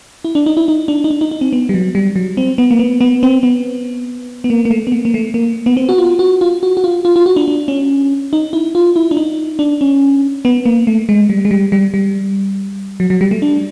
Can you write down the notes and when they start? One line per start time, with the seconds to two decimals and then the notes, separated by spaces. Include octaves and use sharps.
0.25 E4
0.35 D4
0.46 D#4
0.57 E4
0.68 D#4
0.88 D4
1.04 D#4
1.10 D4
1.21 D#4
1.31 D#4
1.41 C4
1.53 B3
1.69 G3
1.74 F#3
1.95 G3
2.16 F#3
2.37 C4
2.58 B3
2.71 A#3
2.79 B3
3.01 B3
3.23 C4
3.43 B3
4.44 B3
4.50 A#3
4.65 A#3
4.70 A3
4.87 B3
4.92 A#3
5.05 A#3
5.14 A3
5.34 A#3
5.66 B3
5.77 C4
5.89 F#4
5.98 F4
6.19 F#4
6.41 F4
6.63 F#4
6.77 F#4
6.84 F4
7.05 F4
7.16 F4
7.26 F#4
7.36 D4
7.48 D4
7.68 C#4
8.33 D#4
8.53 E4
8.75 F4
8.96 E4
9.11 D4
9.17 D#4
9.59 D4
9.81 C#4
10.45 B3
10.66 A#3
10.87 A3
11.09 G#3
11.29 G3
11.45 G#3
11.51 G3
11.72 G3
11.94 G3
13.00 F#3
13.10 F#3
13.21 G3
13.31 A3
13.42 D4